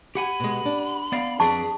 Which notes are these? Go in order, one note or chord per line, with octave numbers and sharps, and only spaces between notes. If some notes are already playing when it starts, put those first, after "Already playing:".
G4 F#5 G#5 B5
B2 G#3
D4
B3 D5 F5
F2 G#4 B4 D5 A5 C#6